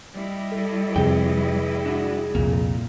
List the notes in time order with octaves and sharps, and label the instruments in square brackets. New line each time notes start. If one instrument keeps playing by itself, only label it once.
[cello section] G3 E4 D#5
[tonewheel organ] A4
[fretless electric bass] F2 C3 [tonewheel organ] G#4 [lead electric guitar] B4 G5
[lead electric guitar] D4 F#4
[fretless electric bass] C2 F2 [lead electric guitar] A#2 A#3